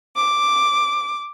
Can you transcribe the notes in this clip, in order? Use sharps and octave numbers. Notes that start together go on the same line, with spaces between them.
D6